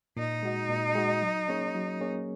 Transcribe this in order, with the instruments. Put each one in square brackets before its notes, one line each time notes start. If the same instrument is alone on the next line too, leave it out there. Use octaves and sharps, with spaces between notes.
[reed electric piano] A#2 [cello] D#4
[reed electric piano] G#3 F#4 D#5
A#2
G#3 F#4 D#5
F#3
A#3 C#4 G#4 C#5
F#3
A#3 C#4 G#4 C#5